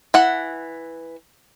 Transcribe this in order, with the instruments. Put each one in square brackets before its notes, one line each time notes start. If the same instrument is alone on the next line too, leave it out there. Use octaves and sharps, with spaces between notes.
[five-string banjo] E3 F#5